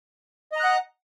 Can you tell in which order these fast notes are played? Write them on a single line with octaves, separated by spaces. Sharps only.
D#5 A#5 F#6 F#5